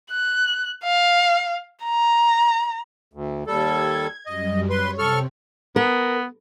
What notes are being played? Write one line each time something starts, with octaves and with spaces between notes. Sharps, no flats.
F#6
F5
A#5
D2
D#2 G3 A4 G#6
F#2 G3 D#5
B4 C#5 C6
C3 C4 A4 C#6 F6
B3 A#4